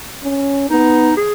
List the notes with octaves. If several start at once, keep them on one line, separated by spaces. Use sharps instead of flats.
C#4
B3 D#4
G#4